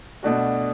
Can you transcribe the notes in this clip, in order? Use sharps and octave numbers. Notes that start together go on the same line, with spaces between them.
B2 A3 D4 F#4